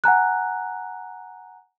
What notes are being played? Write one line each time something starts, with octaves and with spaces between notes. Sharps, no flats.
F#5 G#5 A#5 F#6